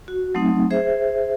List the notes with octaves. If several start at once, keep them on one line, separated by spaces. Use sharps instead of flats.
F#4
F#3 A3 C4 D#4
G#4 C5 E5